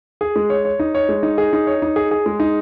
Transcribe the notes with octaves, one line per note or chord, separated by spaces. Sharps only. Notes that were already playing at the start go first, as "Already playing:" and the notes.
G#4
G#3
C#5
C#5
D#4
C#5
G#3
D#4
G#4
D#4
C#5
D#4
G#4
G#4
G#3
D#4